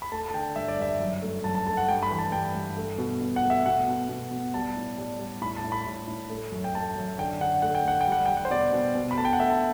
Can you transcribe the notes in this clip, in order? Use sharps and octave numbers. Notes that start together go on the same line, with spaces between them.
B5
A3 A5
A5
D3 G5
G2 E5
D5
G2 E5
F#2
A3
F#2 A5
A5
A3 A5
F#5
G2 G5
B5
E3
A5
G2 G5
G2
A3
B2
B2
F#5
A3
E5
B2 F#5
B2
B2
B2
G3 A5
A2
G3
G3
A2 B5
A5
A2
B5
A2
A2
A3
F#2
G5
A3 A5
F#2
D3 G5
D3 F#5
A3 F#5
G5
A3 F#5
G5
G3 F#5
G3 G5
F#5
C5
B2 D5
B2
B2
B5
A3 A5
G5
F#5
A3 E5
A5